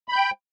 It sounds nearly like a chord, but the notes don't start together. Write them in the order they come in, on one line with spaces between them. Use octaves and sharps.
B5 G6 G5